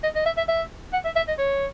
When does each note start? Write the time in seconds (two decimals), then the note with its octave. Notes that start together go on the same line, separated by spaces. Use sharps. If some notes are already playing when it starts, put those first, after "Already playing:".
0.03 D#5
0.15 D#5
0.25 E5
0.37 E5
0.48 E5
0.93 F#5
1.05 E5
1.16 E5
1.28 D#5
1.38 C#5